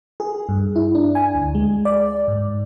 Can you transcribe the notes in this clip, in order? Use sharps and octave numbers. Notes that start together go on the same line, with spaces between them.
G#4
G2
E4
D4
G#5
D2
G#3
D5
G#2